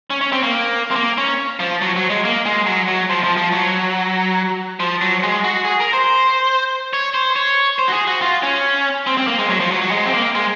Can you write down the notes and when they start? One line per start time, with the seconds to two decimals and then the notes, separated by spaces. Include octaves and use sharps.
0.10 C#4
0.21 C#4
0.32 C4
0.43 A#3
0.91 C4
0.96 A#3
1.18 C#4
1.60 F3
1.81 F#3
1.96 F#3
2.10 G#3
2.25 A#3
2.46 G#3
2.66 F#3
2.88 F#3
3.09 F3
3.23 F3
3.37 F3
3.52 F#3
4.80 F3
5.01 F#3
5.23 G#3
5.44 F#4
5.65 G#4
5.80 A#4
5.93 C5
6.93 C#5
7.14 C5
7.36 C#5
7.79 C5
7.88 F#4
7.92 G#4
8.07 F#4
8.22 F4
8.43 C#4
9.07 C4
9.17 C4
9.27 A#3
9.39 G#3
9.49 F#3
9.60 F3
9.71 F#3
9.81 F#3
9.91 G#3
10.06 C4
10.14 A#3
10.35 G#3